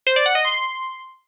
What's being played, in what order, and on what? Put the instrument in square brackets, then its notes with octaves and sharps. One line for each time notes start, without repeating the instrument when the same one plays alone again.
[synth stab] C5
D5
F#5
D#5
C6